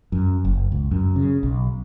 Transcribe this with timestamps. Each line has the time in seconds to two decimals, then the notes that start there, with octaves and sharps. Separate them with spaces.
0.12 F#2
0.45 F#1
0.72 C#2
0.91 F#2
1.16 C#3
1.43 B1